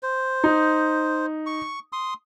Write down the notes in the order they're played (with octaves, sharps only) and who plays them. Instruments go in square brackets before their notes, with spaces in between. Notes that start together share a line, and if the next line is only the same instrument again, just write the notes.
[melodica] C5
[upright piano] D#4
[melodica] C#6
C6 D#6